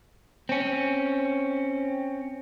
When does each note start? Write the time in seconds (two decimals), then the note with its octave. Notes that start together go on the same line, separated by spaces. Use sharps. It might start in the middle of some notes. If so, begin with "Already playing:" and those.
0.49 C4 C#4